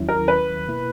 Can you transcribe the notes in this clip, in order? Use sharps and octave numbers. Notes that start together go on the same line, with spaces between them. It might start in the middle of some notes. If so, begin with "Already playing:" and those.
Already playing: D#2 D#3 F#3 C#4 E4
A#4
B4
B2 A#3 E4